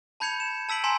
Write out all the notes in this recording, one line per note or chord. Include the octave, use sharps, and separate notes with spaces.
A5 B5 G6 G#6 C#7 F7
E7
A5 E6 B6 D7 F#7
G#5 A#5 C6 B6